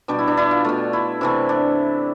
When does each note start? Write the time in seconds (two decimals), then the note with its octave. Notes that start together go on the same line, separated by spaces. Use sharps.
0.08 B2 G3 D4
0.19 E4
0.27 D4
0.37 E4
0.51 F4
0.65 B2 A3 F4
0.93 E4
1.21 C3 E3 A3
1.49 D4